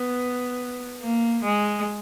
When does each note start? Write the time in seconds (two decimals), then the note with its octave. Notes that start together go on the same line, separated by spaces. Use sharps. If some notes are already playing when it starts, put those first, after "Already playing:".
Already playing: B3
1.01 A#3
1.44 G#3